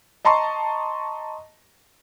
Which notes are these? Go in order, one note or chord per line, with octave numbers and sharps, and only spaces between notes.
D#5 A5 A#5 C6 C#6